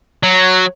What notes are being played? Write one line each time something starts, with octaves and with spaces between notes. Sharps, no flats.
F#3